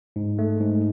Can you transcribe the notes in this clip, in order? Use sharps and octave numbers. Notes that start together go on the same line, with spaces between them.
G#2
A3
G#2